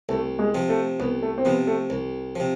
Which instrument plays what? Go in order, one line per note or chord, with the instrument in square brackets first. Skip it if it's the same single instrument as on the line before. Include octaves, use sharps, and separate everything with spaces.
[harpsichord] C2 [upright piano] A3
[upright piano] G#3
[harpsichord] C3 F3
[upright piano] A3
[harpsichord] C2 [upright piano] B3
[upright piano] A3
C4
[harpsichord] C3 F3 [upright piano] B3
[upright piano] A3
[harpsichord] C2
C3 F3